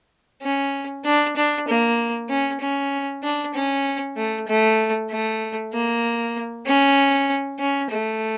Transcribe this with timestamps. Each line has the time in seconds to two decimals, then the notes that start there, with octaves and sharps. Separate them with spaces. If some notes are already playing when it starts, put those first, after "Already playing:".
0.42 C#4
1.05 D4
1.36 D4
1.68 A#3
2.29 C#4
2.61 C#4
3.23 D4
3.54 C#4
4.17 A3
4.48 A3
5.11 A3
5.73 A#3
6.66 C#4
7.59 C#4
7.91 A3